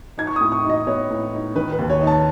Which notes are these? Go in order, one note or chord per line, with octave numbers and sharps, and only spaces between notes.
D#4 G#6
C#6
A2 D#6
C#6
D#4
D#5
B3 C#5
A2
D#4
D#3 B4
B4
D#2
C#5
D#4
A5